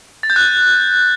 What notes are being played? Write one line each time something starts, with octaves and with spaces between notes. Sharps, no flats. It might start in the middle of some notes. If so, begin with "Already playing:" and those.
A6
G6
F#6